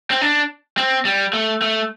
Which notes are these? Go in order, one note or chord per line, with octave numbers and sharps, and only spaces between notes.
C4
D4
C4
G3
A3
A3